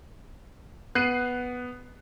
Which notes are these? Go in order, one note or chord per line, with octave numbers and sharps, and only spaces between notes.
B3 F#6 C7 D#7